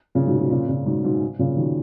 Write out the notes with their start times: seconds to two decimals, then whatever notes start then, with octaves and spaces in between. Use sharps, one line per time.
0.15 A#2 C#3
0.27 G#2 B2
0.38 G#2 B2
0.51 A#2 C#3
0.68 A#2 C#3
0.86 G#2 B2
1.04 G#2 B2
1.39 A#2 C#3
1.57 B2 D#3